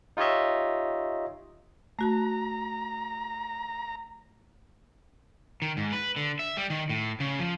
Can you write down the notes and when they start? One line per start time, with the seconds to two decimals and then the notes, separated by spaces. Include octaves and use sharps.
0.17 D#4 F4 G4 C#5 D#5 E5
1.99 A3 F#4 A5 A#5
5.62 D#3
5.77 G#2
5.92 B4
6.16 D3
6.39 E5
6.57 G3
6.70 D#3
6.89 A2
7.20 C#3
7.39 F3